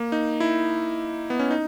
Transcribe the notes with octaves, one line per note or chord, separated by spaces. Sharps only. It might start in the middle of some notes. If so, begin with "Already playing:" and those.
Already playing: A#3
D#4
E4
B3
C#4
D#4